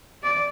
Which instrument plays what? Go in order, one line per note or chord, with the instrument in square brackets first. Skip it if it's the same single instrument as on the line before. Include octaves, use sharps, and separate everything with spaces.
[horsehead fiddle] D5